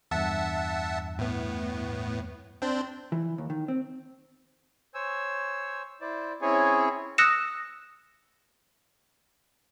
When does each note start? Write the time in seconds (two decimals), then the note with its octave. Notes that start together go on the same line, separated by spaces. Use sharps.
0.11 E2 G2 E5 F#5 A5
1.19 A2 B3
2.62 C4 D4 C5
3.12 E3
3.38 D#2
3.50 D#3
3.68 C4
4.94 C5 C#5 G#5 E6
6.01 E4 C5 D5
6.42 C4 C#4 E4 G#4 C#5 G#5
7.18 D#6 E6 F#6 A#6 C#7 E7